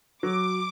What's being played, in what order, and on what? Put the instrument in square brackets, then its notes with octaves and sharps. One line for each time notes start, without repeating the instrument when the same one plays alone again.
[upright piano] F#3 [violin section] D6